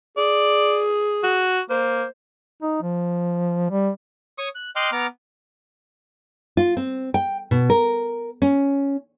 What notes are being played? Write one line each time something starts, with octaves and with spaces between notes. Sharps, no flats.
G#4 D5
F#4
A#3 C5
D#4
F3
G3
C#5 C#6 D#6
F#6
D#5 G5 C6 D6 F6 F#6
B3 A#5 D6 F6
F4
C4
G5
B2
A#4
C#4